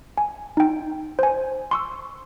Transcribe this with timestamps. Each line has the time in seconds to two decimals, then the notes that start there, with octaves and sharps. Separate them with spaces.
0.18 G#5
0.57 D#4 G5
1.19 C5 G#5
1.71 C6 C#6 E6